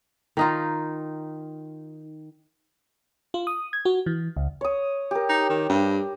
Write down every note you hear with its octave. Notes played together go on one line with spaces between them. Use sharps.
D#3 D#4 F4
F4
D#6
G#6
F#4
E3
C#2
C#5 D#6
G4 A#4
D#4
D#3
G2